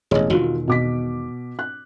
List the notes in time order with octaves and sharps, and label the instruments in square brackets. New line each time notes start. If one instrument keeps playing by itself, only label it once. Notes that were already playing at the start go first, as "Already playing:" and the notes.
[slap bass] E1 A1 [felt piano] G#4 C#5 D#5
[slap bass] E1 D#3 [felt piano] F4 F#4
[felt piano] B2 D6 B6
F#6